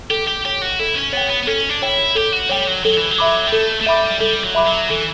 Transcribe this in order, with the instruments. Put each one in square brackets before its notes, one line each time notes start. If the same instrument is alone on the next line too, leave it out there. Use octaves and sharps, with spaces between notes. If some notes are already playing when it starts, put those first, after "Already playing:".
[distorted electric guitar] G4 [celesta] A4
[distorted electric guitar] G4
[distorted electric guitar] G4 [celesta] C#5 G5
[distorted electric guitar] F#4
[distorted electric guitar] E4 [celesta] A4
[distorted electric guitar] C#4
[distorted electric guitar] B3 [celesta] C#5 G5
[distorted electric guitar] B3
B3
[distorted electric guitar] C#4 [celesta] A4
[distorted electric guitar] D4
[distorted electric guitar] E4 [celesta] C#5 G5
[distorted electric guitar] G4 [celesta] A4
[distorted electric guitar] F#4
[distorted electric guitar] G3 [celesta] C#5 G5
[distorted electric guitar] F#3
[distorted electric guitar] F#3 [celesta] A4
[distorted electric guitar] E3
F#3
[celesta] E5 B5 D6
[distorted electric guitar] G3
[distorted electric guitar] A3 [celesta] A4
[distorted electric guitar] A3
[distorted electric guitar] G3 [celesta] E5 B5 D6
[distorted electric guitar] G3 [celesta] A4
[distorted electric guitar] F#3
[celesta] E5 B5 D6
[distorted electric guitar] F#3
[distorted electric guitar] E3 [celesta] A4